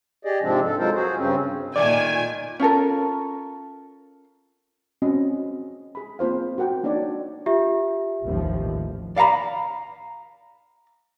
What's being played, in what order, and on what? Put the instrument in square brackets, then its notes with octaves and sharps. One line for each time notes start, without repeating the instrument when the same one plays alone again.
[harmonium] G4 G#4 D5 D#5
G#2 C3 F3 G#3 C4 D4
A4
F#3 G#3 F4 A4 A#4 C5
F#4 G#4 C5
G2 C#3 C4 C#4
[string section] A#2 G#5 G#6 [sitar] D#3 A3 [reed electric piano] D5
[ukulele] C#4 F4 A4 A#4
[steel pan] C4 C#4 F#4 D#5
G#4 B5
A#3 C4 F4 C5 F5
F#4 A#4 F#5 G5
A#3 D4 D#4 C#5 D5
[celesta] F4 G4 E5
[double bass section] A1 D#2 F3
[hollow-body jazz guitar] D5 F5 F#5 A#5 B5